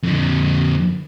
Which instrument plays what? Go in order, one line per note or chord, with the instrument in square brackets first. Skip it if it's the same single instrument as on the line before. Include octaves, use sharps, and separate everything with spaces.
[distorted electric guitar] F2 D3